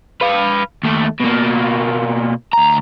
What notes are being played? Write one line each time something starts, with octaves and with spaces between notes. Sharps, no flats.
B4 F5
D#2 A3
B2 A#3
D2 A#5